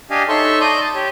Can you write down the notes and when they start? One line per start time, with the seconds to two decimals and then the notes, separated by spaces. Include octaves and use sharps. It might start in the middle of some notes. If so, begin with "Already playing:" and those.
0.10 D4 G4 D#5 F5 G#5
0.28 D#4 A4 C#5 E5 C6 C#6
0.60 D5 D#5 C6 D#6 G6
0.80 A5
0.95 G4 C#5